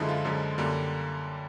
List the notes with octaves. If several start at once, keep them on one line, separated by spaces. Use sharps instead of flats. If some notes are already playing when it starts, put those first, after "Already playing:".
Already playing: F#2 D3 F3 G#3 E4
F4
F#2 D3 F3 G#3
F#2 D3 G3 A#3